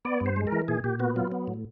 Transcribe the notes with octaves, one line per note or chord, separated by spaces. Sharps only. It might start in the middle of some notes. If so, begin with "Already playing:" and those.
B3 D5
G2
C5
G#3
A#4
E3
A#2 G#4
A#2 G4
B3 F#4
F#3 F4
B3
A2